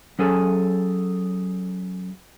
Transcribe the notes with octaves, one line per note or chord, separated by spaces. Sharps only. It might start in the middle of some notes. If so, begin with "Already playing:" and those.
F#3 C#4 G#4 A4 G#5